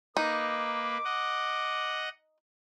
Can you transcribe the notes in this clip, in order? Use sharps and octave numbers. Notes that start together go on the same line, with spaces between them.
A#3 D#4 B4 D6
D#5 F#5